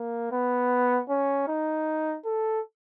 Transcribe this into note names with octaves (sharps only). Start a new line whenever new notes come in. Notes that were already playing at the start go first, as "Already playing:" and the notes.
Already playing: A#3
B3
C#4
D#4
A4